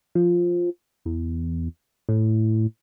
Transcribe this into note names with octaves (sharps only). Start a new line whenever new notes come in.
F3
E2
A2